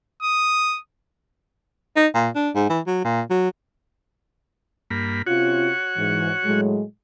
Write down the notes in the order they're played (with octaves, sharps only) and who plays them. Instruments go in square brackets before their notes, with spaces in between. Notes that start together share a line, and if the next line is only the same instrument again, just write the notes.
[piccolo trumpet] D#6
[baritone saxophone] D#4
A#2
D4
G#2
E3
F#3
A#2
F#3
[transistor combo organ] G2 A#3 B5
[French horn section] C3 C#4 F4 [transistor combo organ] F#4 C#5 F#5
[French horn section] G#2 E3
A2 F#3 G#3